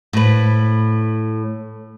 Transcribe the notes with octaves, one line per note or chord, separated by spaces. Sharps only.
A2 B4